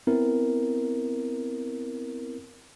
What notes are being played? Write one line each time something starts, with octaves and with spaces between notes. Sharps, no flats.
B3 C4 E4 A#4